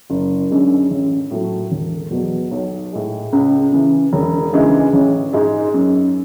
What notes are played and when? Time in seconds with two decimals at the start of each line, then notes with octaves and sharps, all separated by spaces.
0.10 F#1
0.50 F#2 D3 G#3
0.91 A1
1.31 A2 F#3 A3
1.71 E1
2.11 E2 B2 F#3 B3
2.51 B1
2.92 A2 G#3
3.33 C#2
3.72 C#3 E3
4.13 E1
4.53 D2 C#3 E3 G#3
4.93 A1
5.33 G#2 G#3
5.74 F#2